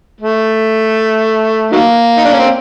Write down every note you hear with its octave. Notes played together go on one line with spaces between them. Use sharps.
A3
D#3 F#3 A#3
D#4
D4
C#4
C4